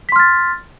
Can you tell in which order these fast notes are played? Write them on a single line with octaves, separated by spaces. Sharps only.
B6 C6 F6 A6